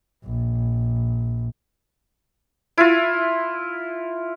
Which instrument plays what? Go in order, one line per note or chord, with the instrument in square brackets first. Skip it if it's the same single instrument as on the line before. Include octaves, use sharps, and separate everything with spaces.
[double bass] A#1
[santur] E4 F4